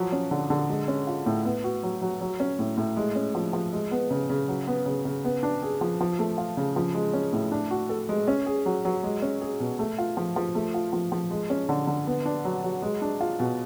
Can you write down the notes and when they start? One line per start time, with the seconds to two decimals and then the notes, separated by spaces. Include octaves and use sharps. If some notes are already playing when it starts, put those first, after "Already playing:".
Already playing: F3 F#3
0.12 C#4
0.31 D3
0.50 D3
0.69 G#3
0.88 C#4
1.07 F4
1.26 A2
1.45 B3
1.64 F#4
1.83 F#3
2.02 F#3
2.21 F#3
2.40 C#4
2.59 A2
2.77 A2
2.97 G#3
3.16 C#4
3.35 F3
3.53 F3
3.73 G#3
3.91 B3
4.11 C#3
4.30 C#3
4.48 F#3
4.67 B3
4.86 C#3
5.05 C#3
5.25 B3
5.43 D4
5.62 G#4
5.81 F3
6.00 F3
6.19 A3
6.38 F4
6.57 C#3
6.76 F3
6.94 G#3
7.13 C#4
7.33 A2
7.52 D4
7.71 F#4
7.89 A4
8.09 G#3
8.28 C#4
8.46 G#4
8.66 F#3
8.85 F#3
9.03 G#3
9.22 C#4
9.41 G#4
9.60 B2
9.79 A3
9.98 F4
10.17 F3
10.36 F3
10.55 A3
10.74 F4
10.93 F3
11.12 F3
11.31 G#3
11.50 C#4
11.69 D3
11.87 D3
12.07 B3
12.26 D4
12.45 F#3
12.63 F#3
12.82 G#3
13.02 D4
13.21 F4
13.40 B2